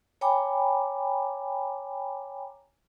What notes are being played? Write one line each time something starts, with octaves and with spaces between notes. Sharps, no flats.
C#5 G5 G#5 A#5 B5 D6